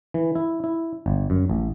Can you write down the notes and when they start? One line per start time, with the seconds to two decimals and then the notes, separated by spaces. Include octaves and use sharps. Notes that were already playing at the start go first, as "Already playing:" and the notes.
0.14 E3
0.35 E4
0.64 E4
1.06 G1
1.30 F#2
1.50 A1